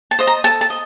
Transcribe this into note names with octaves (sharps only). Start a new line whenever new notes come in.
A5
C5 D#5
A#5
A4 A5
A5
D#5